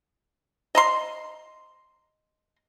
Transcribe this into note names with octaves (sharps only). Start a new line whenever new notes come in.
D#5 A#5 C6